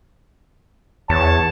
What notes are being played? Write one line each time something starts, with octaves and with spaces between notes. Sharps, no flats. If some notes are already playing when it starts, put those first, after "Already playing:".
E2 C#5 A5